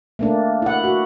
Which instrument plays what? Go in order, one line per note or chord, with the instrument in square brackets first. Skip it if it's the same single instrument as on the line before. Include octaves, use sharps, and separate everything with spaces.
[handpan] A3 A#3 D4
E4 F#5
F#4